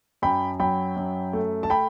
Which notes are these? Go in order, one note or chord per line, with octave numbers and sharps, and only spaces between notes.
F#2 G5 B5
F#3 G5 B5
F#2
A3
A5
G5 B5